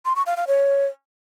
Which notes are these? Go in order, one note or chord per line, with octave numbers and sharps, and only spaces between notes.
C6
C#6
F5
F5
C#5